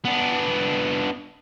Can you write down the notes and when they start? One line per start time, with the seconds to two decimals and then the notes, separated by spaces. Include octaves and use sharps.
0.05 B3 D4